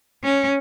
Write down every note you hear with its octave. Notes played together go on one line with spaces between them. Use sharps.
C#4